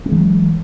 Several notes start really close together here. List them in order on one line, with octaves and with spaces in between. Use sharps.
B3 G#3 E3 F#3